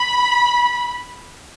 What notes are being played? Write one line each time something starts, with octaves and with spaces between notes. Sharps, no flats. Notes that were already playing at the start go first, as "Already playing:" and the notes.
Already playing: B5